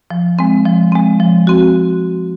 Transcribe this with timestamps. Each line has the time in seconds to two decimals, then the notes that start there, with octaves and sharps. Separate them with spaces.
0.10 F3
0.39 G#3 C4
0.65 F3
0.92 G#3 C4
1.20 F3
1.47 C4 F#4